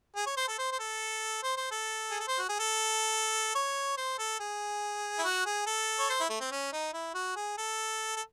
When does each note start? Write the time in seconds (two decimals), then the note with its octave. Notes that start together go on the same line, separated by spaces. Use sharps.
0.16 G#4
0.26 C#5
0.37 C5
0.48 A4
0.58 C5
0.72 C5
0.79 A4
1.43 C5
1.57 C5
1.71 A4
2.11 G#4
2.20 A4
2.28 C5
2.39 F#4
2.49 G#4
2.59 A4
3.55 C#5
3.97 C5
4.19 A4
4.40 G#4
5.18 E4
5.24 F#4
5.46 G#4
5.67 A4
5.99 C#5
6.09 C5
6.20 E4
6.30 A3
6.40 C4
6.52 C#4
6.73 D#4
6.93 E4
7.14 F#4
7.36 G#4
7.58 A4
8.16 A4